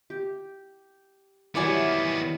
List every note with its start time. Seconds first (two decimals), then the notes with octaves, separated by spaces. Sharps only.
0.10 G4
1.55 D#3 E3 F#3 G3 B3 C#5 D5 G#5